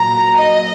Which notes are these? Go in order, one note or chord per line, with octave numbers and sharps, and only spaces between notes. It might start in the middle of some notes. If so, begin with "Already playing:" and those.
Already playing: A#2 F#3 A#5
D#5